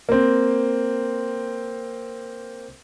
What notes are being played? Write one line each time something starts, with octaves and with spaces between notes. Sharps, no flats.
A#3 C4